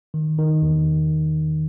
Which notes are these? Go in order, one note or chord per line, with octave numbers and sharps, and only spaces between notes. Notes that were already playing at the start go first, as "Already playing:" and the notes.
D#3
D#3
E2